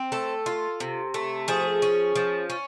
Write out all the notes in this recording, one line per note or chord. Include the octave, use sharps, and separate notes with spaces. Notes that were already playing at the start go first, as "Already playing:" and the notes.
Already playing: C4
A3 A4
F4
C3
A3
F3 G#4
C#4
F3
C#4